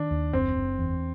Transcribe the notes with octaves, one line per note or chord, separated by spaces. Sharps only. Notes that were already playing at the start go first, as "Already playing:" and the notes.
Already playing: D#3 D4
D#2
F#1 C4
F#1
E2